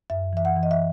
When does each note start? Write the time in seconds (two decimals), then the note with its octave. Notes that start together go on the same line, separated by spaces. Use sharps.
0.10 F#2 E5
0.33 E3 E5
0.45 F#5
0.56 E3
0.63 D#5
0.71 E5